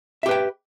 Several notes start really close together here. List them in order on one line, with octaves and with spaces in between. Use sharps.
E5 G4 B4 G5